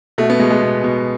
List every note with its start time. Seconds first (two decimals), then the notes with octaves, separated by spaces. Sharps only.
0.18 B2 A3
0.30 B3
0.39 B2 G#3
0.50 G#3
0.62 B2
0.84 B2